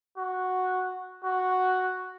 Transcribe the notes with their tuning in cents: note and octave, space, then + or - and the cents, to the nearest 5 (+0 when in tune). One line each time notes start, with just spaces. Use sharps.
F#4 -5
F#4 +0